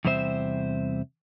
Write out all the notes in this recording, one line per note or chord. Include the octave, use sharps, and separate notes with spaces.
E2 C3 G3 C4 C5 E5